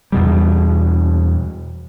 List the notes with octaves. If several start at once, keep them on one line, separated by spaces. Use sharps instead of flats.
E2 B2 G3